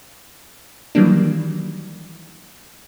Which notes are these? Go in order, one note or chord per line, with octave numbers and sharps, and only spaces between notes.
D#3 E3 F#3 G3 A#3 D4